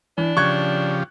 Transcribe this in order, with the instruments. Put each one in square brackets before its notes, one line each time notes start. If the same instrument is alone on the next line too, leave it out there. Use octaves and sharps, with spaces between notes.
[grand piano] E3 [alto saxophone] D4
[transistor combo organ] C#3 F3 G4 [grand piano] C#6 F#6 G#6